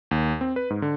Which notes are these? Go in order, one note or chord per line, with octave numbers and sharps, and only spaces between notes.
D#2
C4
B4
G#2
D3